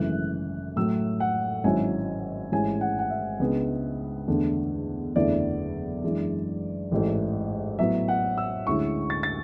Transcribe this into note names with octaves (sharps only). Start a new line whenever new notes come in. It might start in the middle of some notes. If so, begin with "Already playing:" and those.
Already playing: G#1 F#2 C#3 E3 A3 F#6
A2 F#3 A3 E6
F#5
G#1 G#2 F#3 C#4 E4 G#5
A1 G#2 G#3 C#4 E4 G#5
F#5
F#5
E5
C#2 C#3 G#3 B3 D4
E2 D3 A3 D4
F#1 E2 D3 A3 E4 D5
F#2 E3 G#3 D4
A1 G#2 E3 A3
A2 F#3 B3 E4 E5
F#5
E6
D2 D3 G#3 C#4 E4 C#6
A6
A6